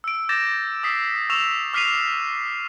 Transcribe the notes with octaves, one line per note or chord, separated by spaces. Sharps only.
E6 D7
D6 G6 A6 A#6 E7
D#6 E6 B6 C7
C#6 E6 E7 F7
D6 F6 B6 C7 D#7 F7